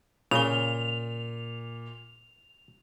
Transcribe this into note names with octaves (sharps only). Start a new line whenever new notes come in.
A#2 C#3 F7 G7